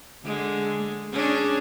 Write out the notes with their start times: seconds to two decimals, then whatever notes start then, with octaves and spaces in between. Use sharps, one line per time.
0.24 D3 G#3
1.13 C#4 D4 G#4